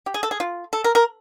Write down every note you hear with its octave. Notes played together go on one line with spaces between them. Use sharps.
G4
G#4
A4
G#4
F4
A4
A#4
A#4